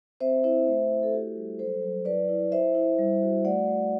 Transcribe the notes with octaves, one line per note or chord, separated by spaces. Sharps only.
C4 C5 E5
E4 C5 E5
A3
E4
A4
F#4 G4
G3
F#3 A4 C5
F#3
E4 B4 D5
E4
E4 C5 E5
E4
G3
F#4
A3 D5 F#5
A3